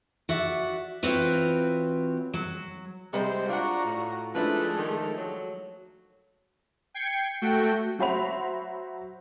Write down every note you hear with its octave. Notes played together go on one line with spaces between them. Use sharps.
F#4 D5 E5
E3 C4 F4 F#4 B4 C#5
F#3
C3 G3 G#3 C5
D4 F4 F#4 F#5 A#5
A2
F3 G#3 A3 D4 E4 A4 B4
D#3
F#3
G5 G#6 C7 C#7
A3 F#4 G5
F#3 F#4 C5 E5 B5 F7